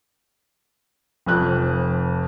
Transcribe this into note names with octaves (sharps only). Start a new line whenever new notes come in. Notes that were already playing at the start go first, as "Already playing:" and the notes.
F1 F2 F#6